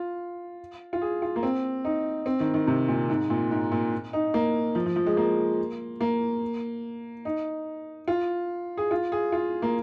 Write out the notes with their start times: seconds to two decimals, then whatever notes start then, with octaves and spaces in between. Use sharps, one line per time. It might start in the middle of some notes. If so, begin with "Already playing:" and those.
Already playing: F4
0.93 F4
1.02 G#4
1.22 F4
1.36 A#3
1.43 C4
1.85 D#4
2.26 C4
2.40 D#3
2.54 D#3
2.67 C3
2.88 A#2
3.10 G#2
3.30 A#2
3.51 G#2
3.72 A#2
4.13 D#4
4.34 A#3
4.75 F3
4.86 F3
4.96 F3
5.06 G#3
5.17 A#3
6.01 A#3
7.25 D#4
8.08 F4
8.77 G#4
8.91 F4
9.12 G#4
9.32 F4
9.62 A#3